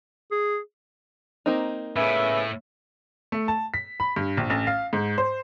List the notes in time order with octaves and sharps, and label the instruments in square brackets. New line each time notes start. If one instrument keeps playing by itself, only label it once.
[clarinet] G#4
[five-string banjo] A#3 C4 D#4
[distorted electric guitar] A2 [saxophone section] C#3 B3 C#4 [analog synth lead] E5
[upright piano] A3
A5
B6
B5
G2
A#1
A1
F5
G#2
C5